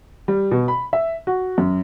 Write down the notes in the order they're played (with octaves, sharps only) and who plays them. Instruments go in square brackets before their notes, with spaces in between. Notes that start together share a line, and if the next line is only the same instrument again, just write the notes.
[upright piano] G3
B2
B5
E5
F#4
F#2